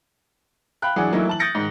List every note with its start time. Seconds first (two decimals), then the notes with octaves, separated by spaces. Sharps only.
0.82 F5 G5 B5 F#6
0.96 E3 F#3 D4 G#4 F#5
1.12 E3 F#3 A3 A#3 D#4 E4
1.27 E3 A5 F#7
1.39 D#6 G6 A6 A#6 C#7 D7
1.55 G#2 D#3